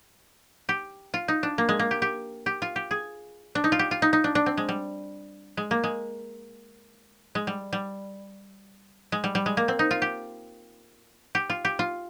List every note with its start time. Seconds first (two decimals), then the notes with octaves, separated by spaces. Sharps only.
0.69 G4
1.14 F4
1.28 D#4
1.43 D4
1.58 A#3
1.69 G#3
1.79 A#3
1.91 G4
2.02 G4
2.46 G4
2.62 F4
2.76 G4
2.91 G#4
3.55 D4
3.64 D#4
3.72 F4
3.79 G4
3.91 F4
4.02 D#4
4.13 D#4
4.24 D4
4.35 D4
4.46 C4
4.57 G#3
4.69 G3
5.57 G#3
5.71 A#3
5.84 G#3
7.35 G#3
7.47 G3
7.73 G3
9.12 G#3
9.24 G3
9.35 G3
9.46 G#3
9.57 A#3
9.68 C4
9.79 D#4
9.91 F4
10.02 G4
11.35 G4
11.50 F4
11.65 G4
11.79 F4